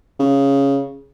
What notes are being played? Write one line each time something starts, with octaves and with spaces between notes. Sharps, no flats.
C#3